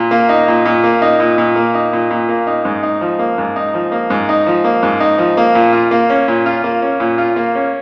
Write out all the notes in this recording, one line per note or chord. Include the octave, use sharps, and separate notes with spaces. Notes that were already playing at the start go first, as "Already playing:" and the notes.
Already playing: A#2
A#3
D#4
A#2
A#2
A#3
D#4
A#2
A#2
A#3
D#4
A#2
A#2
A#3
D#4
G#2
D#4
F3
A#3
G#2
D#4
F3
A#3
G#2
D#4
F3
A#3
G#2
D#4
F3
A#3
A#2
F4
A#3
C#4
A#2
F4
A#3
C#4
A#2
F4
A#3
C#4